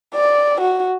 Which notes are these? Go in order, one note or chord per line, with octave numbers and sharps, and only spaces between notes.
D5
F#4